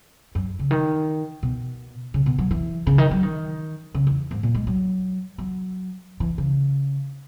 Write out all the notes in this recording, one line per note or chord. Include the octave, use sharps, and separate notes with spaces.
F#2
C#3
D#3
B2
C#3
B2
F#3
E3
C#3
D#3
F#3
D#3
C#3
E2
G#2
A#2
G#3
F#3
F#3
E3
C#3